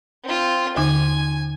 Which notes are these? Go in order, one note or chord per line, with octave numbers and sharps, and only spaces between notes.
C4 F4
D#2 D3 D#4 G#5